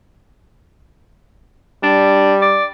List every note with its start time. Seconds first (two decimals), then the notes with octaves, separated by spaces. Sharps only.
1.83 G3 D4
2.42 D5